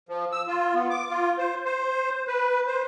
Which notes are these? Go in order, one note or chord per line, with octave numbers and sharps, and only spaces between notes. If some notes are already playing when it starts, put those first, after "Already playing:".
F3
E6
F4
B3
D6
F4
C5
C5
B4
C5